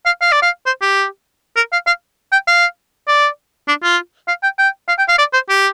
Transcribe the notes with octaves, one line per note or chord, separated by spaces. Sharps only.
F5
F5
D5
F5
C5
G4
A#4
F5
F5
G5
F5
D5
D4
F4
F5
G5
G5
F5
G5
F5
D5
C5
G4